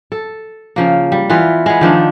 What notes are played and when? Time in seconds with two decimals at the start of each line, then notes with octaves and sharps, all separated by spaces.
0.12 A4
0.76 C#3 F3 A#3
1.12 G3
1.30 E3 B3 F4
1.66 G#3 B3
1.81 D#3 F3 D4 D#4